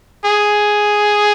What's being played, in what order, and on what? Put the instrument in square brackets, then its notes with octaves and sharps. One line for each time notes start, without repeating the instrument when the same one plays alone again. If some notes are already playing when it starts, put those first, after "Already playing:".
[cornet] G#4